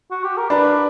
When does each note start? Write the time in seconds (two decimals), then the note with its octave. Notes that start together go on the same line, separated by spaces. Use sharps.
0.11 F#4
0.24 G4
0.37 A#4
0.50 D4 B4